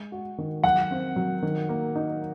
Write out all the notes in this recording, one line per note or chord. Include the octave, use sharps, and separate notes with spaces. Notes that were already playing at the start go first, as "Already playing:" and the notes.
Already playing: G#3
F#4
D#3
F#3 F#5
C4
F#3
D#3
A#3
D#4